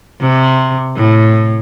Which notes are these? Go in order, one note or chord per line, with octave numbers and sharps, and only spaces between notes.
C3
A2